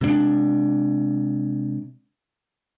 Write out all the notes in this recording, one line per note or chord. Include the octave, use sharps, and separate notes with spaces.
C3 G#3 B3 D4